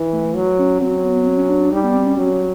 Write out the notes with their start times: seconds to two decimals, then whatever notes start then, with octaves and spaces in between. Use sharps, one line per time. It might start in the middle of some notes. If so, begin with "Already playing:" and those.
Already playing: E3
0.13 A3
0.25 A3
0.35 F#3
0.59 C#4
0.81 F#3 C4
1.04 B3
1.26 C4
1.37 C#4
1.49 D4
1.61 D4
1.71 G3 D#4
1.84 B3
1.95 C4
2.06 C#4
2.17 F#3 C#4